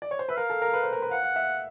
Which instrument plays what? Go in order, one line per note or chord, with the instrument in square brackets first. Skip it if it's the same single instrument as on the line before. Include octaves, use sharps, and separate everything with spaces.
[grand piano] D5
C#5
C5
[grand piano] B4 [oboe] E5
[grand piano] A#4 [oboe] F5
[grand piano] A4
A#4
B4
C5
A#4
B4
[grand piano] F5 [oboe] F#5
[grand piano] F5
E5